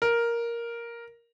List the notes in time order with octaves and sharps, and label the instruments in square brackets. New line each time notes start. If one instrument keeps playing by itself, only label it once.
[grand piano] A#4